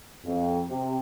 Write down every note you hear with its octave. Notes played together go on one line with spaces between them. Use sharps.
F2
C3